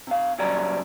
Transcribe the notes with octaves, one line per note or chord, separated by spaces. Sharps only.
C3 F5
A#2 C#3 F#3 G3 D5 A#5